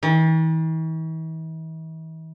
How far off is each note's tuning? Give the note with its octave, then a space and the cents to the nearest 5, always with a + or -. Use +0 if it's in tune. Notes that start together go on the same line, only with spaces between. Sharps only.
E3 -45